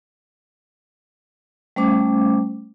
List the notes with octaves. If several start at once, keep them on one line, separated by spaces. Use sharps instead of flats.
G3 A3 C#4 C5 D6